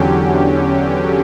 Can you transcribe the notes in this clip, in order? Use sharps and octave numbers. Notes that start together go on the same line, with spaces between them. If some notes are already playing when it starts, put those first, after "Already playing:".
Already playing: E2 D3 F#3 C#4 G4